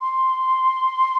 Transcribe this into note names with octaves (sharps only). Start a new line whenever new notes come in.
C6